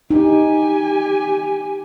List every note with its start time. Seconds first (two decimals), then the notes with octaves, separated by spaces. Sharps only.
0.11 D#4 G4 G#5